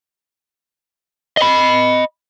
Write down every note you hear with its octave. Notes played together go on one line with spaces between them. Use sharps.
D#5 B5